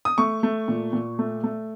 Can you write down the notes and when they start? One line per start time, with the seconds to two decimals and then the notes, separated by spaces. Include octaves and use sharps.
0.05 D#6
0.18 A3 C#6
0.43 A3
0.68 A#2
0.93 A#2
1.19 A3
1.44 A3